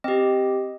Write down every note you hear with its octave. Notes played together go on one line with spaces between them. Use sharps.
C4 G4 D#5